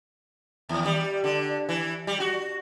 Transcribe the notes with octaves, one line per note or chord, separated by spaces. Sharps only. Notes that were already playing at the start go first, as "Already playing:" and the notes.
D#2
G3
D3
E3
G3
F#4